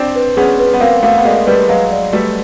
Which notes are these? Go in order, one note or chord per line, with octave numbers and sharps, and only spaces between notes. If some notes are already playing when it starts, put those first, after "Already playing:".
Already playing: C4 D4
B4
B3 C#4 G#4
B4
B3
A#3 C4 F5
A3 B3 F5
B3
G#3 A#3 D5
G3 A3 B4
F#3 G#3 F5
D5
G3 A3 B4